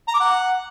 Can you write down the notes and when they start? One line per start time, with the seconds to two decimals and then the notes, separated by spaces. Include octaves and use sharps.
0.08 A#5
0.14 D6
0.20 F#5